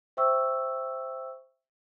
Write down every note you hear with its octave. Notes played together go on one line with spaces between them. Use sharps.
C5 E5 G5 C#6 E6